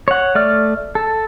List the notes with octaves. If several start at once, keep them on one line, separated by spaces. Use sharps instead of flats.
C#5 F#5
A3 D5 F6
A4